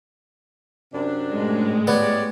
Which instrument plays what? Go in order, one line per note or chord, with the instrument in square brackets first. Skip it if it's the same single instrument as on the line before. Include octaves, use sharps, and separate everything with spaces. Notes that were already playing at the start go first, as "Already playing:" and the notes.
[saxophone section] F#2 C3 D4
[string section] A2 G#3
[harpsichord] B3 [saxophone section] G4 C#5 D5